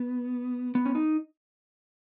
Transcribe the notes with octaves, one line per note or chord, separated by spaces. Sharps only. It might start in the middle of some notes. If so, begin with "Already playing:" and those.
Already playing: B3
B3
C#4
D#4